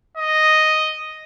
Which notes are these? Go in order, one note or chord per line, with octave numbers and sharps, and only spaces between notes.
D#5